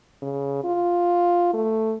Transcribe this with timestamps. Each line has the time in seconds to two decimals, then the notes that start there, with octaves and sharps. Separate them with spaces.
0.23 C#3
0.64 F4
1.54 A3